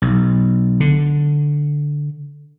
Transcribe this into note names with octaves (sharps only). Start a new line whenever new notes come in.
B1
D3